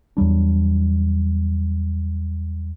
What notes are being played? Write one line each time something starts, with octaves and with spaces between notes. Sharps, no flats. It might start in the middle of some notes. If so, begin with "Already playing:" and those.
E2 F#3 G3 D4